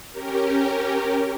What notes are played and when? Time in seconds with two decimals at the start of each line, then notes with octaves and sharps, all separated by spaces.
0.11 C#4 G4 A#4